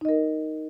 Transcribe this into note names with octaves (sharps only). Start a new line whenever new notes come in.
D#4 A#4 D#5